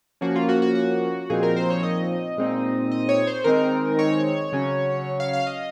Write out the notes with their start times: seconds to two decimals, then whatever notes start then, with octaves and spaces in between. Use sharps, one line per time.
0.21 F3 A#3 C#4 F#4
0.36 F4
0.49 F#4
0.62 F#4
0.75 F#4
1.30 A#2 F3 C4 D#4 G#4
1.43 A#4
1.56 C5
1.70 C#5
1.83 D#5
2.37 A#2 G#3 C4 D#4
2.92 D#5
3.09 C#5
3.27 C5
3.44 D#3 G#3 C4 D#4 A#4
3.99 C#5
4.52 C#3 F#3 C#4
5.20 F5
5.33 F5
5.47 D#5